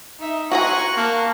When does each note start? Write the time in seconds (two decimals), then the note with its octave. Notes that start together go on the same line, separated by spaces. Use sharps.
0.20 D#4 E5
0.52 F#4 C5 F#5 G#5 A#5 C#6 F#6
0.97 A#3 A5